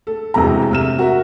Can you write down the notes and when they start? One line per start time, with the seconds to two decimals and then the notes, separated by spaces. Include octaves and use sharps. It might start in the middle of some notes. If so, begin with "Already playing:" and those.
0.07 A4
0.34 E1 E2 C3 A4 A#5
0.71 C3 F6 E7
0.99 F#4 A#4 E5